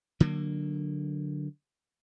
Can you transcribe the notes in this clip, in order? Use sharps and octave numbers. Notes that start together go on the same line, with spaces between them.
D3 F#3 A#3